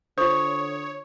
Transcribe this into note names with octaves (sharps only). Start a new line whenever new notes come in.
D3 F4 C5 C#5 C#6 D#6